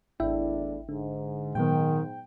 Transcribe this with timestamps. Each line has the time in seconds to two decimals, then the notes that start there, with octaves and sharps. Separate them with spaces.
0.20 G#1 E2 A3 D4 E4 E5 G5
0.89 G#2 D3
1.55 A#2 D#3 F#3 B3 G5